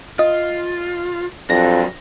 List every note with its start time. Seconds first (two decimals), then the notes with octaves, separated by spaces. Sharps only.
0.19 F4 D#5
1.50 F2 F#3 D4 A#6